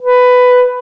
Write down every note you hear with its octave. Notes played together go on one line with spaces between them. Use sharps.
B4